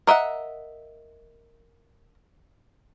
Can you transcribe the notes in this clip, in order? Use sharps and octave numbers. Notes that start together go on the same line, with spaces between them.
A#4 D#5 E5 F#5